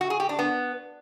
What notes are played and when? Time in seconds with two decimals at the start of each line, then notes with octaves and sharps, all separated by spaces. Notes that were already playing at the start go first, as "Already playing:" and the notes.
0.01 F#4
0.10 G#4
0.20 G4
0.29 D4
0.39 B3